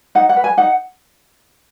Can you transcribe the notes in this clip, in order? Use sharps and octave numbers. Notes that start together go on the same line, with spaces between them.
D#4 F#5
F#5
B4
G#5
D#4 F#5